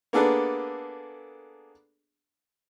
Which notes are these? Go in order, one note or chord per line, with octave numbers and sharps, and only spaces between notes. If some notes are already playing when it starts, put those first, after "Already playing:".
A#3 B3 D4 G#4 A4 B4